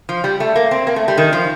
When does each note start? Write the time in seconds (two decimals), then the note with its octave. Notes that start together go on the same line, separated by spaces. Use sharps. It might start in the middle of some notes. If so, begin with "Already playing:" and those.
0.09 F3
0.24 G3
0.40 A3
0.56 A#3
0.71 C4
0.87 A#3
0.96 A3
1.08 G3
1.17 D#3
1.33 F3